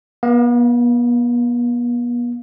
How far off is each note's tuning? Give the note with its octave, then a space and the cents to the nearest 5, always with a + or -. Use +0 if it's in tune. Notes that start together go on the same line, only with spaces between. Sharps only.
B3 -40 F5 +5